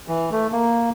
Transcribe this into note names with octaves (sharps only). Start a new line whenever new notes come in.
E3
A3
A#3